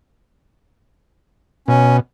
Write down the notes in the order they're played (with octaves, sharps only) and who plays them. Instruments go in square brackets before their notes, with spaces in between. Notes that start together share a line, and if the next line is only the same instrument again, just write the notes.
[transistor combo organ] B2 [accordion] C#4